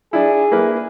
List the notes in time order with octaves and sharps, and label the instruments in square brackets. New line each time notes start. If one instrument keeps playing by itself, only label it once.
[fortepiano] D4 E4 [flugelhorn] G#4
[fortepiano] A#3 E4 B4